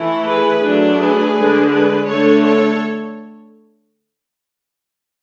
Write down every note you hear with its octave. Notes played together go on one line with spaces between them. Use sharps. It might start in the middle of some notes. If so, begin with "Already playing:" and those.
Already playing: E3 A3 E4
G#4 B4
F#3 A3 D4
G#4 B4
D3 G#3 D4
G#4 B4
D3 A3 D4 A4 C#5
A4 C#5